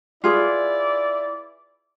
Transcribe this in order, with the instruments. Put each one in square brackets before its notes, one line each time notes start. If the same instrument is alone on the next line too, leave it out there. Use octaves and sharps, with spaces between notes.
[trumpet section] E4 D5 [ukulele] F4 G#4 B4